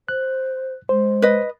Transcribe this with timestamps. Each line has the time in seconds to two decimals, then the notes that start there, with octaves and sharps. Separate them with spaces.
0.08 C5 F#6
0.89 G#3 C5
1.22 B4 D#5